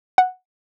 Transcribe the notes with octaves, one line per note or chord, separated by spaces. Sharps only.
F#5